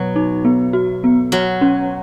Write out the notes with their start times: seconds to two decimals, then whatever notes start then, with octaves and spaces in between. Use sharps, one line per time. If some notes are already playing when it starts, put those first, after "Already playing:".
Already playing: B2 F#3
0.16 D#4
0.45 B3
0.73 F#4
1.04 B3
1.32 F#3 F#4
1.61 C#4